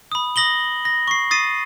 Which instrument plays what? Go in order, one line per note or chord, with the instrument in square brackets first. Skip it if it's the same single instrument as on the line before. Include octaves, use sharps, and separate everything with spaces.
[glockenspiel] B5 D#6
D#6 A#6 F#7 G7
A#6
C#6 C7
D#6 A6 C7 D#7